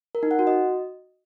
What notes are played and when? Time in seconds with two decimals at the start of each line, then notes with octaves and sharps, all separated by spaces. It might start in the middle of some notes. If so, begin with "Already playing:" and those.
0.15 A#4
0.23 D#4
0.31 F#5
0.39 F#4
0.47 D#5